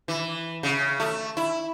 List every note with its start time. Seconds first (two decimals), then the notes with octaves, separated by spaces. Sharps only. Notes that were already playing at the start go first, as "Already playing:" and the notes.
0.08 E3
0.63 C#3
1.00 A3
1.37 E4